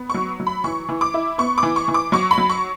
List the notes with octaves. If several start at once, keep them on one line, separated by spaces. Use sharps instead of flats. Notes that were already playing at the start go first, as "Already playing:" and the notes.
Already playing: B3
F#3 C#6
F#3
B5
E3 C#6
E3
D6
E4
B3 C#6
D6
E3
C#6
E3
D6
F#3 C#6
B5
F#3
C#6